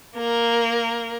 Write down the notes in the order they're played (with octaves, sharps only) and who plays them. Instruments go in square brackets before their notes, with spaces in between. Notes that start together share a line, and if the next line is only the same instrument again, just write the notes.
[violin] A#3 A#4